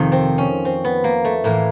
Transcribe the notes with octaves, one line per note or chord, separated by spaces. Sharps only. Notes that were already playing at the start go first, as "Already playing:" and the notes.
Already playing: F2 C3 D#3
C4
C#4
C4
B3
A#3
A3
A2 E3 A#3